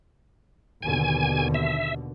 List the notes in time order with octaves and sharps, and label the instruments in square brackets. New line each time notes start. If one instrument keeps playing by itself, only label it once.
[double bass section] D#2 B2 D3 [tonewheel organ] G#5
[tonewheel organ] E5